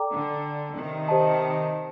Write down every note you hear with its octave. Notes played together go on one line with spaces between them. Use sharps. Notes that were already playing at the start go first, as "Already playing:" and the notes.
Already playing: A4 D5 G5 A#5 D6
D3
C3 D#3
G4 C5 D#5 A5